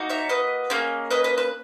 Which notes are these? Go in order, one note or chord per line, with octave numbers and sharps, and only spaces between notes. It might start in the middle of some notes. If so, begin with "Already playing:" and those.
Already playing: A#3 D#4 F#4
C#5 E5
B4 D#5
A#3 C#4 G#4
B4 D#5
B4 D#5
B4